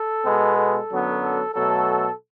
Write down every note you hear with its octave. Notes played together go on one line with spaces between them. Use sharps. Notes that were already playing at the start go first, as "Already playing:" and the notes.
Already playing: A4
B2 G#3 B3
A4
F#2 D3 F#3 B3
A4
B2 F#3 A3 A4